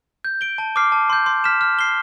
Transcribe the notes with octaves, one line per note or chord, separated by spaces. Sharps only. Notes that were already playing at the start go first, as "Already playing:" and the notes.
G6
D7 G7
A5
D6 F6 C7
A5
C6 G6
C6
F6 B6 E7
F6
C7 G7